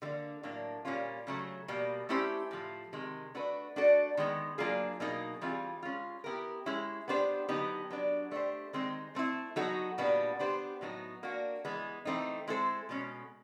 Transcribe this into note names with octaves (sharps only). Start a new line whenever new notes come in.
D3 G3 A#3
A2 F#3 A#3 D4
A#2 G3 A#3 C#4 F4
C#3 F#3 A3
B2 G3 A#3
A3 C#4 E4 G4 C5
A2 F3 A3
C3 D#3 G#3
A3 D4 F#4 B4
A3 D4 F#4 A4 D5
D#3 G#3 B3
F#3 A#3 D4 F4 G#4
B2 F#3 A#3 D#4 G#4
E3 G3 C4 F4 G#4
G#3 C#4 F4
B3 E4 G4 A#4
G#3 C#4 E4
B3 D4 G4 C5
D3 F#3 B3 D#4 G4
F#3 B3 D4
A3 D4 G4 C5
D#3 G#3 C4 D#4
A3 C4 E4
F#3 B3 D#4 F#4 A4
A#2 G3 B3 D4 F#4
B3 D4 G4 C5
A2 F#3 B3 D#4
A#3 D4 F#4
E3 G#3 B3
E3 A3 C4 D#4
G#3 C4 E4 A4 C5
B2 G#3 C#4